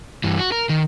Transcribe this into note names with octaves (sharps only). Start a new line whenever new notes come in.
G2 E3
F#4
A#4
D#3